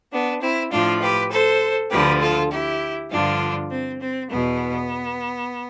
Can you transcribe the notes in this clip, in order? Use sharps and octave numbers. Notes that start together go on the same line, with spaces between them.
B3 D4
C4 E4
A2 F3 D4 F4
G4 B4
A4 C5
D2 D3 F3 G4 B4
F4 A4
E4 G4
G2 D3 F3 D4 F4
C4
C4
E2 B2 B3